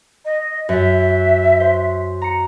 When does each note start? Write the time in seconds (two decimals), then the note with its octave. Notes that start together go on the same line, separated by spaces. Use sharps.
0.25 D#5
0.69 F#2 E5
1.60 C5
2.22 A#5 C#7